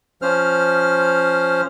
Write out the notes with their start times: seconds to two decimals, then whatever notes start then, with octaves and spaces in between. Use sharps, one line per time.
0.22 F3 C#4 C5 F6